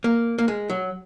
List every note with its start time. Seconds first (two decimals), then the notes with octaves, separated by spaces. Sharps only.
0.04 A#3
0.38 A#3
0.48 G#3
0.70 F#3